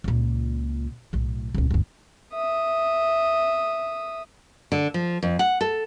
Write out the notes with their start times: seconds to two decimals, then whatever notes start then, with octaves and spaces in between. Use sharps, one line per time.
0.04 C#2 A#2
1.13 B1 A2
1.55 D#1 C#2
1.71 G1 D2
2.33 E5 D#6
4.72 D3
4.94 F3
5.23 F2
5.39 F#5
5.61 A4